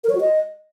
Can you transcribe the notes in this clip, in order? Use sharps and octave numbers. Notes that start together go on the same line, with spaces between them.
A#4
C#5
F#4
D#5